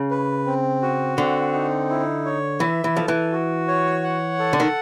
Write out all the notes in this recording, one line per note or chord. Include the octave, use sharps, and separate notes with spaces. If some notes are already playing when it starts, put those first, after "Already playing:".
Already playing: C#3
B4
C4
F#4
D3 C4
D#4
E4
C#5
E3 E5
E3
F3 A4
E3
F#4
C#5
F#5
A4
D3
D#3